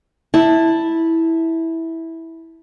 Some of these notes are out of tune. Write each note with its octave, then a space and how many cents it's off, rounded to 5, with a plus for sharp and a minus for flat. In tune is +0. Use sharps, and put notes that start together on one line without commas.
E4 -10 A5 +5